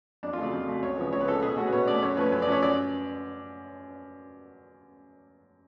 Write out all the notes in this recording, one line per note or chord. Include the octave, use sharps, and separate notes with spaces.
F2 D4
F4
C#3 F#3 A3 D5
F2
C#3 F#3 A3
C#2 C#5
C#3 F3 B3
C#2 C#5
B4
C#3 F3 B3 A4
B2 G#4
A3 C#4 F#4
B4
B2 C#5
A3 C#4 D5
F#2 C#5
F3 A3 C#4 B4
F#2 B4
D5
F3 A3 C#4 C#5
F#2 D5